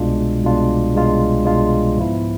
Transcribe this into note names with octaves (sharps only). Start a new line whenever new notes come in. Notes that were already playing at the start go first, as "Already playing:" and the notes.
Already playing: C2 B2 G#3 D4 F4
C2 B2 G#3 D4 F4
C2 B2 G#3 D4 F4
C2 B2 G#3 D4 F4
G#2 F3 B3 E4